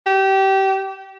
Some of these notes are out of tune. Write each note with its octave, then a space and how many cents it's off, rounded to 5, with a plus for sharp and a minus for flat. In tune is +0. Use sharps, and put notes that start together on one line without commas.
G4 -25